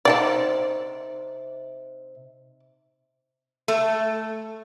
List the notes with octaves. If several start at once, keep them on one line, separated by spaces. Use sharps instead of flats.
C3 D#4 C5 D5 G5 A5
A3